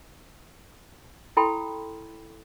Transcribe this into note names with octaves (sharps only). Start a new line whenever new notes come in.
E4 A4 G5 B5 C6